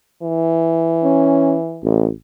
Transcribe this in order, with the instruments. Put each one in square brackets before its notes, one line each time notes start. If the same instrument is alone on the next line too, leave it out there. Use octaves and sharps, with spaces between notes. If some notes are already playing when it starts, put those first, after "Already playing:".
[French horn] E3
[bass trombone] C#4
A1